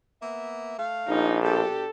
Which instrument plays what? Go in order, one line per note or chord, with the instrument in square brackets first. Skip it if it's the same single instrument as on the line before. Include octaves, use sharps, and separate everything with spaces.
[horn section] A#3 B3 E5
A3 F5
[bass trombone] A#1 [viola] D#4
[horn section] B2 D4 G4 [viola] A4